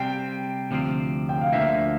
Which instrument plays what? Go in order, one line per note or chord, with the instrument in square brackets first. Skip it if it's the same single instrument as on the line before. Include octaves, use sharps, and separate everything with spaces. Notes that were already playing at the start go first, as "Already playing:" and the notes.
Already playing: [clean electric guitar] C3 G3 C4 [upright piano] G5
[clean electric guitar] D2 C3 F3 C4
[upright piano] G5
F5
[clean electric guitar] D2 D3 F3 A#3 [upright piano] E5